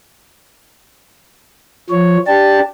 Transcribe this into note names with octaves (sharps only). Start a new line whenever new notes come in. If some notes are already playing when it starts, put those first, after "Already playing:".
F3 C#5
D4 G4 A5